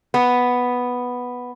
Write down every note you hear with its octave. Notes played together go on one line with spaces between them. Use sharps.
B3